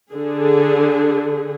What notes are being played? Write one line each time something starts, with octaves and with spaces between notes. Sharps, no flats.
D3 G#4